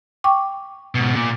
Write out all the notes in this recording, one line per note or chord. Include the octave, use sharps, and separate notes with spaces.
G5 C#6 D6
G#2 B2
A#2